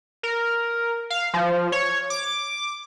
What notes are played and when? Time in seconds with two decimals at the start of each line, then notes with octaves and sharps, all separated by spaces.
0.23 A#4
1.10 F5
1.34 F3
1.72 C#5
2.10 D6